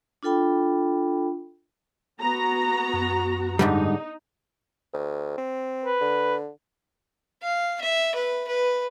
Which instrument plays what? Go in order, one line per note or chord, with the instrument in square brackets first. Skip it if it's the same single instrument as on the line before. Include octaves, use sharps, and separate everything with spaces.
[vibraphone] D4 F4 A4 G5 B5
[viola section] B3 F#4 A#5
[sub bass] F#2
[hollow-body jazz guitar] G#2 D3 G3 [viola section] D#4
[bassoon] D2
C4
[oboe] B4
[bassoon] D3
[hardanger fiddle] F5
E5
B4
B4